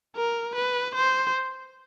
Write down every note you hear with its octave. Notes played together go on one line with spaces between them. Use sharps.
A#4
B4
C5